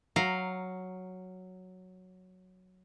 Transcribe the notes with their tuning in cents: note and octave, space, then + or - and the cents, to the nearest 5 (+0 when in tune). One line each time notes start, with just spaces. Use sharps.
F#3 +0 F5 +0 A#5 +0